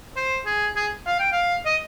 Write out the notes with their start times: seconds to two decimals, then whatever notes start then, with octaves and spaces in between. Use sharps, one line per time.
0.16 C5
0.46 G#4
0.76 G#4
1.06 F5
1.19 G5
1.32 F5
1.66 D#5